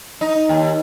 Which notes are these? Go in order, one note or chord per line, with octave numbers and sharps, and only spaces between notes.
D#4
D#2